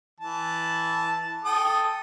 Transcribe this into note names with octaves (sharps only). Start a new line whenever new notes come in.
E3 A5
A4 G5 D#6